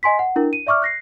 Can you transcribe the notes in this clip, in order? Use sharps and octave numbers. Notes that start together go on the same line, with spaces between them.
D#5 G#5 C6 B6
F#5
D4 E4 A#4
D#7
D5 E5 C#6 D6 F6
F#6 A#6 C7